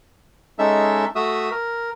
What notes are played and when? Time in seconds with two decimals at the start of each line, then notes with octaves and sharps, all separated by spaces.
0.59 G#3 C#4 D#4 A4 E5 E6
1.15 A3 F#4 E5 D#6 E6
1.51 A#4